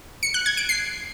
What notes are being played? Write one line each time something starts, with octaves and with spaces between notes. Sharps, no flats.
C#7
F#6
G#6
D7
C7